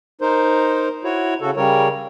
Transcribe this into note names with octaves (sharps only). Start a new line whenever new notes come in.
D#4 A#4 C5
E4 F#4 C#5
C#3 F#4 A4
C#3 G3 A#4 C#5